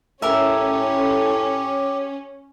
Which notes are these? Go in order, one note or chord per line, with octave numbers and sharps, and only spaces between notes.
A2 C#4 G4 A#4 E5